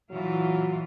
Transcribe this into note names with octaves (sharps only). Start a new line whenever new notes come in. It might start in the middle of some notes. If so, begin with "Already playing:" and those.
A#2 E3 F#3 F4